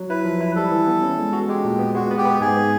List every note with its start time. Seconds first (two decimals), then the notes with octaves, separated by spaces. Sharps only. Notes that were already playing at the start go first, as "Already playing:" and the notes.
Already playing: F#3
0.10 E4 B4
0.25 F3
0.41 E4
0.56 G3 A4
0.72 E3
0.87 B3
1.02 C#4
1.18 G#3
1.33 F#4
1.49 G#3 G4
1.65 A#2
1.79 B3
1.95 G#3 F#4
2.11 B3
2.18 G4
2.25 B3
2.41 G#2 G#4
2.57 B3